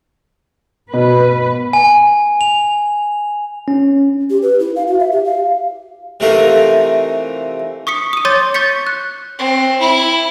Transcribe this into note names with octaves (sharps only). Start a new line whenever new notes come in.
B2 B4
G#5
F7
C#4
G4
B4
E4
F5
F#4
E5
G4
F5
C3 E3 A3 D#4 F4 A#4
C#6 D#6 B6 C#7
D#6 D#7
C#5 C6 D6 G6 A6 D#7
C#6 G6 A6 B6 C#7
F#6
C4
E4